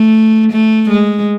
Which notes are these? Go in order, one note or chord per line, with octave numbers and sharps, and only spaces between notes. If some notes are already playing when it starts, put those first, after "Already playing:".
Already playing: A3
A3
G#3